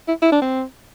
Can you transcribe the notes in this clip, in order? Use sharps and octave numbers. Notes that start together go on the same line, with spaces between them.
E4
E4
D4
C4